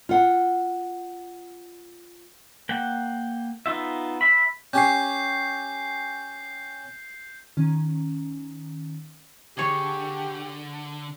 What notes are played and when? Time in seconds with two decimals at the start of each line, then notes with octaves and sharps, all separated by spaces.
0.09 F4 F#5
2.69 A#3 F#5 G5
3.66 B3 D#4 F4 E5
4.21 E5 B5
4.73 C#4 G4 C#5 G6 C7
7.57 D#3 C#4
9.57 D3 G4 G#4 C#5